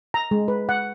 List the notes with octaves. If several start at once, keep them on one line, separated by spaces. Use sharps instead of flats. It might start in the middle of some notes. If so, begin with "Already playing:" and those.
A#5
G#3
B4
F#5